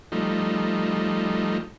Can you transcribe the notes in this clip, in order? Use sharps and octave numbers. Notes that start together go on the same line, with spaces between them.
F3 G3 A3 D#4